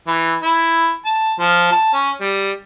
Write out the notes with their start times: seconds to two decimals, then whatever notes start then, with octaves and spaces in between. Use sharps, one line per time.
0.07 E3
0.43 E4
1.05 A5
1.40 F3
1.72 A5
1.94 C#4
2.21 G3